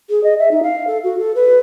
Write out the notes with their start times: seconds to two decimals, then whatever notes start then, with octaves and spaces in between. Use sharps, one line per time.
0.10 G#4
0.23 D#5
0.39 E5
0.51 D#4
0.63 F5
0.87 A4
1.03 F#4
1.19 A4
1.35 B4